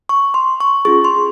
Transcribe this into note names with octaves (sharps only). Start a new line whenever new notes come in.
C#6
C6
C#6
C#4 F4 G#4 C#6
C6